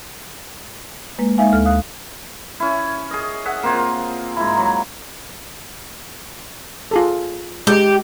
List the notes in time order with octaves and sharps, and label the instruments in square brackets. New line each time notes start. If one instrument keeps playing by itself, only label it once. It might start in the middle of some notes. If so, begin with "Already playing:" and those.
[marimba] G#3 A#3 B4
G#3 A#3 D#4 E5 F5 G#5
D2 A4 F6
F5 D#6 F#6
[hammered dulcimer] C#4 E4
G#4 D#5
G#4 E5 F#5
A#3 C4 F4
G#2 E4
F#3
[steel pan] F4 G#4 A4
[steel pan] G#3 D#5 [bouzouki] G4